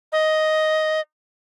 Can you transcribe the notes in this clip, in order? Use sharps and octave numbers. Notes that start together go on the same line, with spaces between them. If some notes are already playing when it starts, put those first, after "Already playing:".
D#5